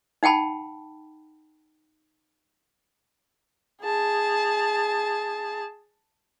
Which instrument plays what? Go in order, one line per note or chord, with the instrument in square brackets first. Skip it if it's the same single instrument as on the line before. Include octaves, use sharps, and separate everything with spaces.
[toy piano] D#4 F#5 G5 A5 B5
[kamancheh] G#4 A5